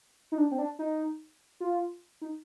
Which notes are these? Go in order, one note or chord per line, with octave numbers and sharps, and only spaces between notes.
D#4
D4
C4
D4
D#4
F4
D#4